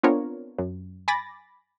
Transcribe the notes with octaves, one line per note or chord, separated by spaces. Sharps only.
B3 C4 D4 F4 A#4 C#5
F#2
G#5 B5 D6 A6 A#6